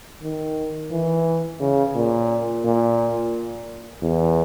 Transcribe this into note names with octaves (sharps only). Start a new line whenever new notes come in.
D#3
E3
C#3
A#2
A#2
E2